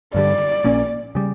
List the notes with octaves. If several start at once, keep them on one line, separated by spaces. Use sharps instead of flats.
G2 D3 G3 D5
A#1 A#2 A#3 C#4
C#3 G3